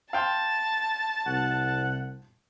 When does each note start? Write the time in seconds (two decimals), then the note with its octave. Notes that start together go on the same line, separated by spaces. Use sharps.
0.13 F5 G5 A5 C6
1.27 C2 F#5